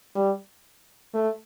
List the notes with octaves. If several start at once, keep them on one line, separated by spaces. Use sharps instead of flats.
G3
A3